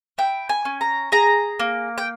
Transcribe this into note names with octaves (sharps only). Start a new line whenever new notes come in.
E4 G5
G#5
C#4
A#5
G#4 A#5
A#3
G5